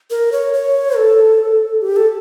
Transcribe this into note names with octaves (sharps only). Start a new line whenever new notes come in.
A#4
C#5
C#5
A4
G4
A4